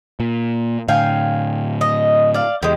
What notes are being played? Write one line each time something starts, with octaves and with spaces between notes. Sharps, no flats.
A#2
A2 D3 F5 G5 G#5
D#5
D5 F5
E2 G#3 G4